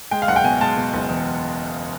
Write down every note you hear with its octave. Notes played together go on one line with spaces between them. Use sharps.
G#3 G5
F5
F#1 F#5
G5
B2 G#5
G#3 A5
B2
F#1
E2